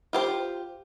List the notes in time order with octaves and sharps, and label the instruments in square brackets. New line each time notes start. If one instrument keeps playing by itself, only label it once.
[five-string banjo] F4 G4 C5